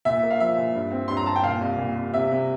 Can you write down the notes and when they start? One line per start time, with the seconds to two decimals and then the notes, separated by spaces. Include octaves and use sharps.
0.05 A#2 E5
0.23 A#3
0.31 F5
0.40 F3 E5
0.57 A#2
0.75 G2
0.92 C4
1.08 G2 C6
1.17 A#5
1.26 G2 A5
1.36 G5
1.44 A#2 F5
1.61 C2
1.78 A#2
1.96 C2
2.13 C3 E5
2.31 C3